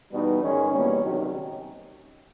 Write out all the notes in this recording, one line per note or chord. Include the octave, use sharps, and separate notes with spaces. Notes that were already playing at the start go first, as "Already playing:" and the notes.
E2 B2 G3 B3 D#4
G#2 D#3 G#3 C#4
E2 B2 G3 A#3 C#4
C#2 C3 D#3 F#3